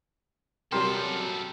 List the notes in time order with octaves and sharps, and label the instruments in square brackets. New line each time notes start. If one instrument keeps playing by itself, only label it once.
[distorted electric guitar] F#2 A4 [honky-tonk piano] C3 F#3 G3 [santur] G4 A#4 C6